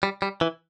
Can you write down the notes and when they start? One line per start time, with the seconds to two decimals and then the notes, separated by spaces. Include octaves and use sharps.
0.03 G3
0.22 G3
0.41 E3